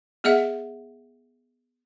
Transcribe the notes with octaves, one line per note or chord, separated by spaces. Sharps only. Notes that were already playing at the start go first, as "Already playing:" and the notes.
B3 G#4 D#5 E5 F#5